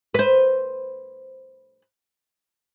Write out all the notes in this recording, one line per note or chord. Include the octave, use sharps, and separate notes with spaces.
B4 C5